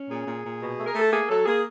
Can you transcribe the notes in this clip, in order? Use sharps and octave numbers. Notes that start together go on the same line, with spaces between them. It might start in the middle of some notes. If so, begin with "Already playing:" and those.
Already playing: C#4
A#2 G#4
A#2
A#2
B2
A3
A#4
A3 A4
A#3 G#4
F#3 A4
A#3 G#4